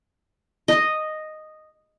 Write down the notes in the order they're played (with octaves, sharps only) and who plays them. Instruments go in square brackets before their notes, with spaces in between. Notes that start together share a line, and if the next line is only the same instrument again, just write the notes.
[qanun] D#5